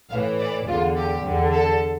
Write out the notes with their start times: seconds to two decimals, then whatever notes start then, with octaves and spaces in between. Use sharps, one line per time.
0.11 A2 E3 F5
0.39 D5
0.67 E2 D3 F4
0.96 G4
1.24 E2 D3
1.52 A4